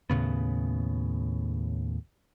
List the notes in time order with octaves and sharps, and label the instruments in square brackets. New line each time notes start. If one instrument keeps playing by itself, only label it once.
[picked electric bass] D#2 A2 C#3 B3